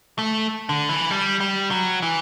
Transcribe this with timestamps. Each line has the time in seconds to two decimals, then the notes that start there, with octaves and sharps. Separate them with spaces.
0.18 A3
0.69 D3
0.89 E3
1.11 G3
1.40 G3
1.71 F#3
2.02 E3